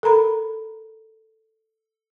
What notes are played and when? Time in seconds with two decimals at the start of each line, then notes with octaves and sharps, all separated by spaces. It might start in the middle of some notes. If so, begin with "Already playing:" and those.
0.03 A4 A#4 A#5 B5